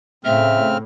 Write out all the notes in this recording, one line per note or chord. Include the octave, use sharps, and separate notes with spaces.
A2 C#3 C4 E5 F6